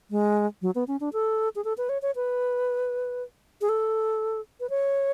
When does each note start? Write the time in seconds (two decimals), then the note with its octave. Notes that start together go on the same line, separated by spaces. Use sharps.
0.10 G#3
0.62 F#3
0.75 B3
0.88 C#4
1.00 D4
1.13 A4
1.56 G#4
1.64 A4
1.78 B4
1.89 C#5
2.02 C#5
2.16 B4
3.61 G#4
3.69 A4
4.60 B4
4.70 C#5